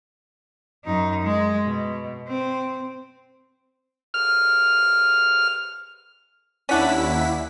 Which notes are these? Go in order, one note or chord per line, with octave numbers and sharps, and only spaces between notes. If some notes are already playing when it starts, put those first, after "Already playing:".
F#2 D#4
G#3
B2
C4
F6
D#2 C#4 D4 E4 D5 F#5 B6